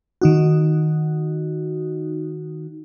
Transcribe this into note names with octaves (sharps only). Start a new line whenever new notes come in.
D#3 D#4 F#4